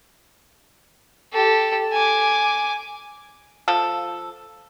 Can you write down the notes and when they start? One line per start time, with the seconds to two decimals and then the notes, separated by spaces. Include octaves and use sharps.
1.33 G4 A4
1.93 G#5 D6
3.68 F3 A4